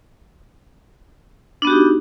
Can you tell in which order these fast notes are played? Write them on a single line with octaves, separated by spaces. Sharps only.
D4 B3 F#4 G4 D#4